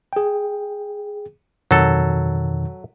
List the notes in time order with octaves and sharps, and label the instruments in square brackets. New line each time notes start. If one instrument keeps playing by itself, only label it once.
[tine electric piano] G#4 G5
[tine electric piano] F2 B2 D#3 [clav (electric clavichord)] F#3 A4